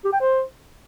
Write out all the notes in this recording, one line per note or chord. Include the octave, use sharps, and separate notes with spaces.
G4
G5
C5